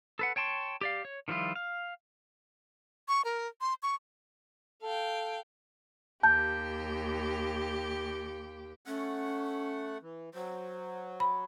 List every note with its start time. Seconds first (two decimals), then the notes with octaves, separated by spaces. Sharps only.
0.19 A4 B4 F#5
0.36 C#5 G5 A5 C6 C#6
0.81 G4 D5 F5
1.05 C#5
1.28 D#3 F3 G3 E4 F4
1.55 F5
3.08 C#6
3.25 A#4
3.61 C6
3.83 C#6
4.83 A4 F5 G5
6.23 D#2 G4 A5 G6
8.86 A3 C#4 F#5
10.02 E3
10.34 F#3 C5
11.20 B5